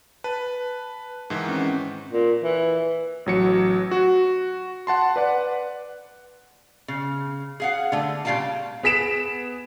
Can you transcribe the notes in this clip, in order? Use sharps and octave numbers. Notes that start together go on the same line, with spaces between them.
B4 A5
G#2 D#3 E3
C4 C#4
A#2
E3
A1 F#3 C#7
F#4
F#5 A5 C6
B4 D5 F#5
C#3
G#4 F5 F#5
D3 A3
A#2 C#3 G3 F5 G5 A5
B3 G#4 B6 D7 E7